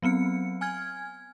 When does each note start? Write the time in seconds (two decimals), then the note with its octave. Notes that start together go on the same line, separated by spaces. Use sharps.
0.02 F#3 B3 C4 C#7
0.61 G#5 F6 G#6